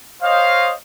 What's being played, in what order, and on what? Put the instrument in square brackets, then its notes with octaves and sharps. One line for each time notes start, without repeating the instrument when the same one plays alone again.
[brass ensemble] C5 C#5 D#5 F5